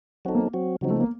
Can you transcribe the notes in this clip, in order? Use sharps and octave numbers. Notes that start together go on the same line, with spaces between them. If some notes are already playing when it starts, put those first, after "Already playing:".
F#3 C4 D#4 F#4 A4
A#3
F#3 C4 F#4
C#3 F3 F#3 C4 D#4
A3
A#3